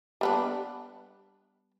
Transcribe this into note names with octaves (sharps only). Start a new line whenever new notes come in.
G3 B3 D4